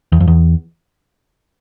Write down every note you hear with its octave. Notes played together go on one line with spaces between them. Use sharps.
E2
F2
E2